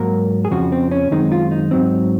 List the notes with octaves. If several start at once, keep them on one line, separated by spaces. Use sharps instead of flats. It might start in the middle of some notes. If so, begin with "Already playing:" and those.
Already playing: G#2 F#3 A#3 A#4
G#4
F2 C#3 F3 F#4
C4
C#4
F#2 D#3 G#3 C4 D#4
F4
D#4
G#2 F#3 C4